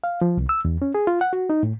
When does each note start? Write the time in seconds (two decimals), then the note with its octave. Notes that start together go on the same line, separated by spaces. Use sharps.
0.04 F5
0.21 F3
0.37 C2
0.49 E6
0.65 E2
0.82 C#4
0.95 G#4
1.07 F4
1.21 F#5
1.33 F#4
1.50 D#4
1.63 A2